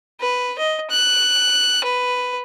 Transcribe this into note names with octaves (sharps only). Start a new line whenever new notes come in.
B4
D#5
F#6
B4